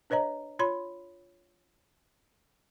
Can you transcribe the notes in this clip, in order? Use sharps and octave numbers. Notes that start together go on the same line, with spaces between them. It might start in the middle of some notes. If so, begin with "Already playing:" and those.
D4 B4 C#5 D#5 A#5
F4 C#5 B5 C6